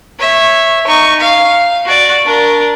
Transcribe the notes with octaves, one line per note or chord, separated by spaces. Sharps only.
C#5 E5
D#4 C#6
F5
F#4 D5
D4 A#4